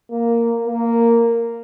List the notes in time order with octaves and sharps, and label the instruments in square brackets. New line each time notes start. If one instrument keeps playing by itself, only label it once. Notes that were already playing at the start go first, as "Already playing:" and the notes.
[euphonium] A#3
A#3